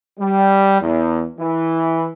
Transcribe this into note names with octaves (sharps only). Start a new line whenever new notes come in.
G3
E2
E3